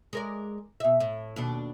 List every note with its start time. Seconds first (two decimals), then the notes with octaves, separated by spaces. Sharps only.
0.13 G#3 A#4 D5
0.80 B2 E5
1.00 A2
1.36 D#2 B2 D4